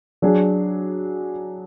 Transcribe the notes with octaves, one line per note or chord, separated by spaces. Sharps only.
F#3 D4 G#4